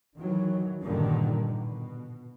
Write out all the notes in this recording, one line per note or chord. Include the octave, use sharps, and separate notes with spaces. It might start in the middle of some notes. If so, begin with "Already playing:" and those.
D#3 E3 F#3
G2 A#2 D3 D#3 G3
B2